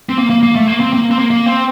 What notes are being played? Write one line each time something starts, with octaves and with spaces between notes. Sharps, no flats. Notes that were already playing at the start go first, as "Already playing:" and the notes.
C4
A#3
A#3
A#3
A3
A#3
C4
A#3
C4
A#3
A#3
C4